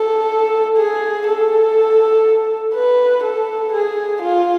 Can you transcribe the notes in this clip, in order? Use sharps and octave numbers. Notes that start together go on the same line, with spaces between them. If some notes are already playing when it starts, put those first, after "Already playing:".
Already playing: A4
G#4
A4
B4
A4
G#4
F4